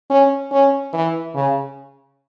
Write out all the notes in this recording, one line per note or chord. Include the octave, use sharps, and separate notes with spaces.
C#4
C#4
E3
C#3